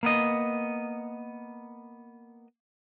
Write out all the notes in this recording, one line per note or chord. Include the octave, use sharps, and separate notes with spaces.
A#3 B3 D#5